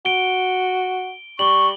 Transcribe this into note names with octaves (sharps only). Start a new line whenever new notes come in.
F#4 D7 G7
G3 C#6 F#7 G7